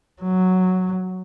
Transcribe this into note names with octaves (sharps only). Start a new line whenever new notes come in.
F#3